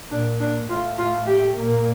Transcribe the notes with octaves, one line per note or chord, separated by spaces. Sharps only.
A#2 A#3 D4
D4
A2 A3 F4
F4
G4
A#2 A#3